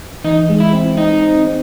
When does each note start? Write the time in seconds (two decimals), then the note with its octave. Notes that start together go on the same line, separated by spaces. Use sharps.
0.24 E3 D#4
0.49 G#3
0.60 E4
0.73 C4
0.97 C4 D#4
1.23 C4
1.47 C4